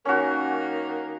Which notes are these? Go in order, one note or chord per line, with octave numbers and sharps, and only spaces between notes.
D#3 A#3 C#4 F#4